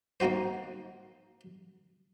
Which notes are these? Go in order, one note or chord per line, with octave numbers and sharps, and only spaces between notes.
A#3 C4 D#4 F#4 C5